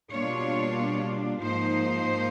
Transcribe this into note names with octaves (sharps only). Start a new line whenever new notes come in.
B2 G3 A#3 D4 F4 C#5
G#2 F3 A#3 D#4 C5